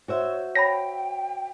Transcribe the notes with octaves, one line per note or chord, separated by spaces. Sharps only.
F#4 C5 C#5 E5
C#5 G5 A5 B5 A#6